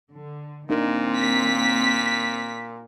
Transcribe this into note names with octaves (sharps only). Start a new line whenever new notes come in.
D3
A#2 D#3 A#3 C4 D4 D#4 A#4
B6